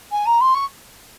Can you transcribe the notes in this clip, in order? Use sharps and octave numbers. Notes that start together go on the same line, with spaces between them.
G#5
A#5
C6
C#6